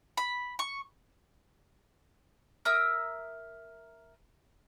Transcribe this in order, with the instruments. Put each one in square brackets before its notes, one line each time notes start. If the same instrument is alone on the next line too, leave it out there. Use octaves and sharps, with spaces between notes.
[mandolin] B5
C#6
A#4 E5 D#6 E6